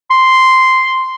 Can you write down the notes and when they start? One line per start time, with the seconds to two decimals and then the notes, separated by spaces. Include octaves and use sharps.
0.11 C6